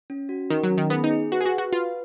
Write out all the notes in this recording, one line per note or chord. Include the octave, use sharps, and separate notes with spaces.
C#4
F#4
D#3 A#4
F#3
C#4
D#3
B3 G#4
D#4
G#4
F#4 B4
G#4
F#4
B4
F#4
F4 B4